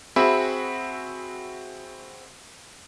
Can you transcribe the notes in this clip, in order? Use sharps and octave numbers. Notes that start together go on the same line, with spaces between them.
C4 F#4 G#4 E5 G#5 B5